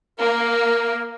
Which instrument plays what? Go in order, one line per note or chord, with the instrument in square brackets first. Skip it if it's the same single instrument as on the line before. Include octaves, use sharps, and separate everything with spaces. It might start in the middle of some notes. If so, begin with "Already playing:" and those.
[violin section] A#3 [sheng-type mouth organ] A#4